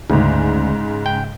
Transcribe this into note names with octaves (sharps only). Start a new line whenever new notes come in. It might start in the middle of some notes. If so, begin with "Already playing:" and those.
D2 G#2 C#3
G5